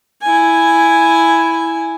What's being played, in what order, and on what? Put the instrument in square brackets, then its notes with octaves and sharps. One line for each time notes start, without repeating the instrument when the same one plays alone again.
[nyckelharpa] E4 G#5